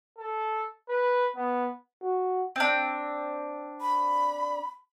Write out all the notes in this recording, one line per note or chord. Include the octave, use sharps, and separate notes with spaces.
A4
B4
B3
F#4
C4 D4
B5